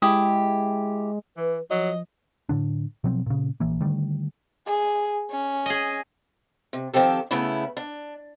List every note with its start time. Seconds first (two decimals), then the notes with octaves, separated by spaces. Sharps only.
0.02 G#3 E4 G4 D#6
1.37 E3 B4
1.71 F3 F#3 D#5
2.49 A2 D3 D4
3.04 B2 F3 F#3 C4
3.26 A#2 C#3
3.60 A#1 E3 A#3
3.80 D3 D#3 G3 A3
4.66 G#4
5.31 C#4
5.66 G#4 D#5
6.73 C3
6.94 D#3 F3 C4 G4 A4
7.31 C#3 A3 B3 C#4 E4
7.77 D4